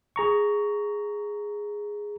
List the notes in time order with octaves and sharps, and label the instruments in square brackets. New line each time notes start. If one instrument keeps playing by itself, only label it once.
[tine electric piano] G#4 A#5 C#6